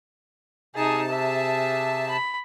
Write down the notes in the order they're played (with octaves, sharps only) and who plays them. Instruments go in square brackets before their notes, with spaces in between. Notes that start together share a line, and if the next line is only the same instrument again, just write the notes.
[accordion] C3 A5 [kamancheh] D#4 G#4
[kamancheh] G#4 E5
B5